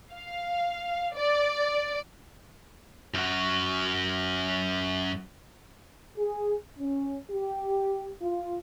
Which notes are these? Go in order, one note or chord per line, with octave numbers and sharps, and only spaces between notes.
F5
D5
F#2 F#4
G#4
C#4
G4
F4